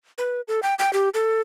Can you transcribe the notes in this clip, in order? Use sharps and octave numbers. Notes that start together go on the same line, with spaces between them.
B4
A4
G5
G5
G4
A4